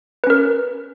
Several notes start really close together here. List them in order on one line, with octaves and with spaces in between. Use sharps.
B4 C#4 A#4